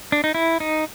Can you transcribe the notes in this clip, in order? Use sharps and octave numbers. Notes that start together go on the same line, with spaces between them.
D4
D#4
E4
D#4